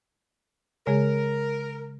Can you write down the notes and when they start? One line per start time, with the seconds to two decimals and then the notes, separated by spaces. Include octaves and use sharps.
0.87 C#3 G#3 G#4 A#4